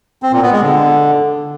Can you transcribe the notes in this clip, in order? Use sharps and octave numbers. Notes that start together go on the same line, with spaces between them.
C4
A#2
B3
G#3
D3